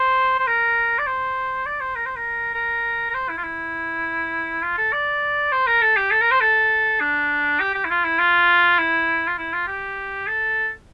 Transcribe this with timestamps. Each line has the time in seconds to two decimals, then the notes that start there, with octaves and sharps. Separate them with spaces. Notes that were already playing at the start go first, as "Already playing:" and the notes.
Already playing: C5
0.39 C5
0.47 A#4
0.98 D5
1.06 C5
1.66 D5
1.80 C5
1.96 A#4
2.06 C5
2.16 A#4
2.55 A#4
3.10 A#4
3.14 C5
3.29 E4
3.37 F4
3.44 E4
4.63 F4
4.78 A4
4.92 D5
5.52 C5
5.67 A#4
5.82 A4
5.97 G4
6.11 A4
6.21 A#4
6.31 C5
6.41 A4
7.00 D4
7.60 G4
7.75 G4
7.85 E4
7.90 F4
8.04 E4
8.19 F4
8.79 E4
9.28 F4
9.38 E4
9.53 F4
9.67 G4
10.27 A4